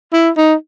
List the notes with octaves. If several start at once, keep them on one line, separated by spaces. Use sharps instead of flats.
E4
D#4